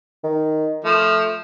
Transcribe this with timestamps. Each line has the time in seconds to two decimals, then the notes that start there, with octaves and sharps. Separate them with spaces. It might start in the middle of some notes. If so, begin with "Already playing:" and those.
0.24 D#3
0.84 F3 A3